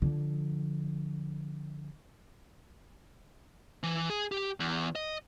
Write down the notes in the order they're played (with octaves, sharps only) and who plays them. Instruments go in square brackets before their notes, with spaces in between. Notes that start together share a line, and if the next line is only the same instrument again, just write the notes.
[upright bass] D3 F3
[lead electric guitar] E3
G#4
G4
E2
D#5